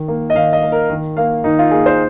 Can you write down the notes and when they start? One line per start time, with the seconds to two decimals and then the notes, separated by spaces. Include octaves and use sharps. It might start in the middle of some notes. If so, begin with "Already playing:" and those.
Already playing: D#3
0.08 A#3
0.30 D#5
0.35 D#3 F5
0.53 D#5
0.62 A#3
0.72 A#4
0.89 D#3
1.17 A#3 F5
1.44 D#3 D#4
1.59 F4
1.71 A#3 G#4
1.86 C5